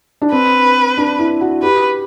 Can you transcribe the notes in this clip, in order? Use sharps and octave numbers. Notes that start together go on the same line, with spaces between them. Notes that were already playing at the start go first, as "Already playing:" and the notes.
D4
C4 B4
D4
E4
F#4
G4 B4